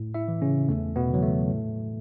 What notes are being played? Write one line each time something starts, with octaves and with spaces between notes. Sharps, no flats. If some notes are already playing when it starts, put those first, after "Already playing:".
Already playing: A2
E4 E5
E3
C#3 C#4
E2 A3
B2 B3
C#3 E3 F#3
A3
A2